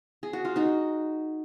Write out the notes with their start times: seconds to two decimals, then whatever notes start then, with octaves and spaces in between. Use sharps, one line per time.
0.23 G#4
0.33 F#4
0.45 F4
0.56 D#4 F#4